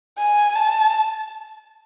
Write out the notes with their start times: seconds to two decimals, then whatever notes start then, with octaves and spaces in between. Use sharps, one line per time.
0.18 G#5
0.56 A5